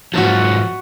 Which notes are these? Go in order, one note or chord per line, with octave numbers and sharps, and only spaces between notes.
G#2 F3 F#3 F#4 E5 A5